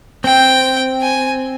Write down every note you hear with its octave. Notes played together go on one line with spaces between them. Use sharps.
C4 G5
G#5